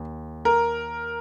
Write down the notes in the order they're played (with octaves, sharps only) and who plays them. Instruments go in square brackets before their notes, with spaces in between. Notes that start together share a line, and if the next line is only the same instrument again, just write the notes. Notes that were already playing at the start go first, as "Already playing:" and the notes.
Already playing: [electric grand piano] D#2
[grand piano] A#4